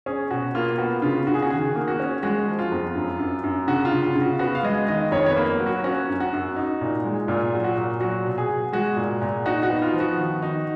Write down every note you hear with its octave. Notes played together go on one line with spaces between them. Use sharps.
C#4 G#4
B2 F#4
A#3 F4
B3 F#4
C#3 F4
C#3 F#4
G#4
F#4
D#3 G#4
A#3
F#4
C#4
G#3 F#4
F3
F4
F2
F#2
F#2
F#2
C#3 F#4
F4
C#3
F4
C#3
F#4
B3 F#4
F5
G#3 D#5
D#3 D#5
F2 C#5
C#5
B4
A#3
F#3
F#4
C#4 F#4
F#2
F#4
F#2
D#4
A#2
G#3
A#2 F4
F#3
F#4
A#2
F#3 F#4
B2
G#4
B2
G#3 F#4
A#2
A#2
D#4 F#4
F#4
B3
F4
F3
F#4
D#3
D#4